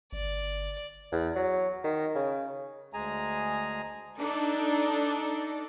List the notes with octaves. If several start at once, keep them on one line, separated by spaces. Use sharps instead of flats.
G1 D5
E2
F#3
D#3
C#3
D2 G#3 G#4 G#5 A#5
D4 D#4 A4 D5